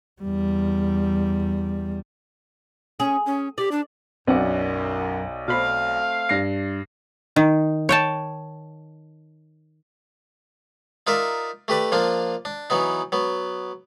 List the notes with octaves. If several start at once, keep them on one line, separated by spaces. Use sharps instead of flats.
E2 G3
C#4 G#4
C#4
G4 D5
D4
B1 F#2 B3 C4 D4 D5 F#5
B2 A3 C4 C5 F5 B5
G2 A#6 C7
D#3
C#5 G5 A5
D#4 F4 A#4 D5 E5
A3 G4 B4 D5
F3 A#3 D4 F4
D4
E3 F#3 B3 D#4
F#3 B3